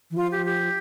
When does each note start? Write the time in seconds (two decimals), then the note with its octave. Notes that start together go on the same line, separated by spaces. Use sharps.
0.11 E3
0.17 F3 F4
0.32 G4
0.46 G4